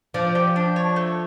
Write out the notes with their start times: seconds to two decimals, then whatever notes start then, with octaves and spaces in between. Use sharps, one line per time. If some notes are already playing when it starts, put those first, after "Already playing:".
0.14 F3 D4
0.35 G4
0.56 D4
0.76 C#5
0.96 A3